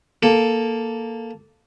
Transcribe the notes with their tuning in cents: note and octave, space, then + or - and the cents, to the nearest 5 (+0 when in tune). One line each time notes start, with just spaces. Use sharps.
A#3 +0 A4 +0